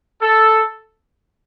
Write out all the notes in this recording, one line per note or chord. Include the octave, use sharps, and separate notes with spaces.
A4